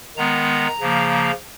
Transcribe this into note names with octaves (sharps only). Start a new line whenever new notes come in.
D#3 G#3 B3 A#5
C#3 F3 A#3